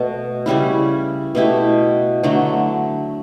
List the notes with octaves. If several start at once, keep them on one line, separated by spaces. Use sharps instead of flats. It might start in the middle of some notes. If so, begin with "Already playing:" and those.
Already playing: B2 A3
C#3 G3 C#4 E4
B2 A3 E4 G4
D3 F#3 A3 D4